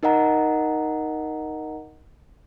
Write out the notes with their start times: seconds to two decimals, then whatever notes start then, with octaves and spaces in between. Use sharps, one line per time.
0.03 D#4 A#4 D#5 F#5 A#5